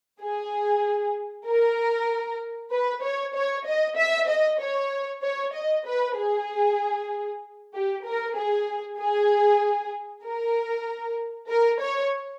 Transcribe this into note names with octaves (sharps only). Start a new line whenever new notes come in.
G#4
A#4
B4
C#5
C#5
D#5
E5
D#5
C#5
C#5
D#5
B4
G#4
G4
A#4
G#4
G#4
A#4
A#4
C#5